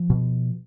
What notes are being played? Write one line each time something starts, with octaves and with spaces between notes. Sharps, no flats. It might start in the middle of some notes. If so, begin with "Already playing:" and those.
Already playing: F3
B2